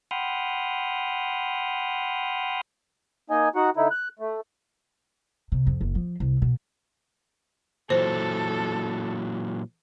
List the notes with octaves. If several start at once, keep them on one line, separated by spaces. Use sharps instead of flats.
F#5 G5 B5 C6 D#6 F6
A#3 D#4 D#5 G#5
D#4 F#4 F#5
D3 D#4 E4
F#6
A3
C3
F2
F#1
F3
C2
B2
A#2 E3 F#3 A4 C5